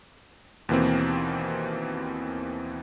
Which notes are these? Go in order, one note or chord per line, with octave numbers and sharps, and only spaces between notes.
D#2 B2 E3 A#3 C4